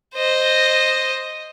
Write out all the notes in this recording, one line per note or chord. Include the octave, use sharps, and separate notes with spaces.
C5 D#5